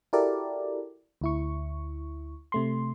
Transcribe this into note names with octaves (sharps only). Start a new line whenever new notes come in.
E4 F#4 G4 A4 A#4 D5
D2 E4 C#6
C3 A3 C6